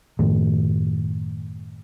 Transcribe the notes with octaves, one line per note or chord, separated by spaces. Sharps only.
F#2 A2 D#3 A3